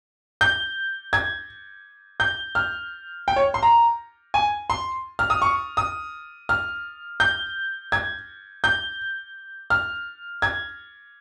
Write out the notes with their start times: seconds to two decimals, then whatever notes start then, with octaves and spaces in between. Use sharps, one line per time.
0.41 G6
1.13 G#6
2.20 G6
2.55 F6
3.28 G5
3.36 C#5
3.54 C6
3.63 A#5
4.34 G#5
4.70 C6
5.19 F6
5.30 D#6
5.42 C#6
5.77 D#6
6.49 F6
7.20 G6
7.92 G#6
8.64 G6
9.70 F6
10.42 G#6